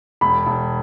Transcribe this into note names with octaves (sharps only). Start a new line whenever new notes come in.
E1 B5
E1